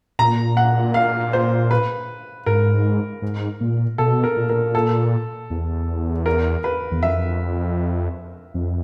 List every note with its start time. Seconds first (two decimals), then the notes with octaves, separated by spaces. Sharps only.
0.19 A#2 A#5
0.57 F#5
0.94 F5
1.33 C5
1.71 B4
2.46 G#2 A#4
3.22 G#2
3.61 A#2
3.98 B2 A4
4.24 A#4
4.37 A#2
4.49 A#4
4.75 A4
5.50 E2
6.26 A#4
6.64 B4
6.91 E2
7.02 F2 E5
8.54 F2